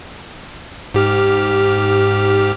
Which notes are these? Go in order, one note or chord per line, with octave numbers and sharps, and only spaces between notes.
G#2 G4 F6